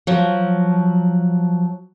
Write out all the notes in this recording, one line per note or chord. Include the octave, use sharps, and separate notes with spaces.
F3 F#3